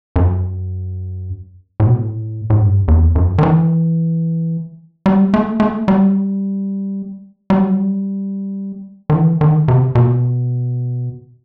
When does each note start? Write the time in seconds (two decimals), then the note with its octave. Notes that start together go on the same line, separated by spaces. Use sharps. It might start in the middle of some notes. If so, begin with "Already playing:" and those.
0.16 F#2
1.80 A2
1.87 B2
1.96 A2
2.50 A2
2.61 G2
2.88 E2
3.15 F#2
3.38 D#3
3.43 E3
5.06 G3
5.34 A3
5.60 A3
5.88 G3
7.50 G3
7.62 F#3
7.75 G3
9.10 D#3
9.14 E3
9.41 D#3
9.68 C3
9.95 B2